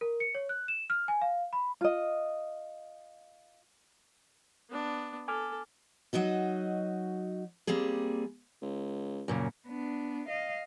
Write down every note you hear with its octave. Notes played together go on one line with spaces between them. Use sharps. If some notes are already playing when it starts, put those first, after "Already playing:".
A#4
C#7
C#5
F#6
E7
F6
G#5
F5
B5
F4 D#5
B3 D4
A4 G#5 D6 F6
F#3 D#4 F#4 D#5
G3 A#3 C4 G#4
C#2
F#2 A#2 C#3
B3 D4
D#5 F5